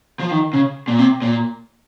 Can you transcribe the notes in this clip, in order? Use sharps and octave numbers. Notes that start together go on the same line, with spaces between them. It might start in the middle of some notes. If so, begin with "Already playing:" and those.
F3
D#3
C#3
A#2
C3
A#2